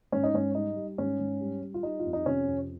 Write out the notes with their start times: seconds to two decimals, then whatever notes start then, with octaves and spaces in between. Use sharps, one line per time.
0.12 G#2 C#4
0.23 D#4
0.34 G#2 C#4
0.55 G3 D#4
0.76 G3
0.98 G#2 C#4
1.19 G#2
1.41 G3
1.62 G3
1.74 F4
1.83 G3 D#4
2.00 F4
2.05 F2
2.13 D#4
2.26 C3 C#4
2.47 F2